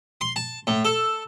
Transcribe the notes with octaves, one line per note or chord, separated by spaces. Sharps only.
C6
A5
A2
A4